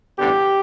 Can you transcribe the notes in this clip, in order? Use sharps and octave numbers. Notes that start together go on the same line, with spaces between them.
A1 G2 D3 B3 G4